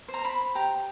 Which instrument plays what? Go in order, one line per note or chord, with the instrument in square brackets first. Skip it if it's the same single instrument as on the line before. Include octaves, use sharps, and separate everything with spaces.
[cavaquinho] C5
A#5
B5
G4 A#5